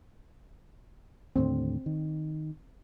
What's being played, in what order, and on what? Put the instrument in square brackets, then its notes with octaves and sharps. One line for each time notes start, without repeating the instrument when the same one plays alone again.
[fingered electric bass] D#2 A2 D3 [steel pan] C4
[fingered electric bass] D#3